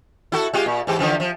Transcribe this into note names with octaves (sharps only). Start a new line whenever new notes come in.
E4 F#4 A4
G#3 F4 G4
A#2
G#2 E3 G4
D3 E3 F3
F3